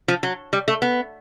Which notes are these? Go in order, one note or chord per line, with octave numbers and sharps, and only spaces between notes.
F3
F#3
G3
A3
B3